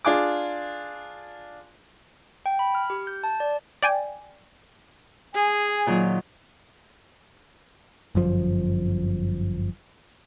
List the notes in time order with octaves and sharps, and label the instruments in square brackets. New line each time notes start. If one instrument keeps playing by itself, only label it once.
[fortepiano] D4 F4 G#4 D6
[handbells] G5
B5
F6
G4
G6
A5
D5
[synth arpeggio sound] D5 G5 G#5
[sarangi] G#4 [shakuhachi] G#5
[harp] A#2 D#3 F#3
[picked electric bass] G1 F#2 F3